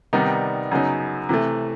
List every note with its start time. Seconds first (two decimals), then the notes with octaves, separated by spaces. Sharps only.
0.13 C3 D#3 G3 B3 D#4
0.71 F#2 C#3 F#3 B3 D#4
1.29 C3 E3 A3